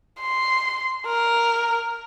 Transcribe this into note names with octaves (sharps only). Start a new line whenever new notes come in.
C6
A#4